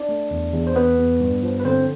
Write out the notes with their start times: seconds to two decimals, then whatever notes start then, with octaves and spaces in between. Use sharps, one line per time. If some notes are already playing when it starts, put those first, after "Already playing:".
Already playing: D4 D5
0.09 A3
0.31 E2
0.53 E2
0.67 C5
0.76 E2 B3 B4
0.98 E2
1.20 G2
1.43 F3
1.59 B4
1.65 D3 C4 C5